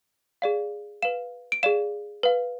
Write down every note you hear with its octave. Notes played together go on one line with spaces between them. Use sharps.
G#4 D5 F5
B4 F5 E7
D7
G#4 D5 F5 E7
B4 F5